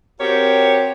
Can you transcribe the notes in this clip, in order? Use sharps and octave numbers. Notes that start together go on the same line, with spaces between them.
C4 F#4 G4 A#4 C#5